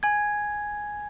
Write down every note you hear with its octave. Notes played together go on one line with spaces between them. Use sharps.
G#5 G#6